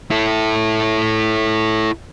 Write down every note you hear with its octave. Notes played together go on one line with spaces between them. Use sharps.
E4 A4